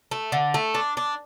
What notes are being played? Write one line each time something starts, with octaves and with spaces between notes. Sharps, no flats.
A3
D3
A3
D4
D4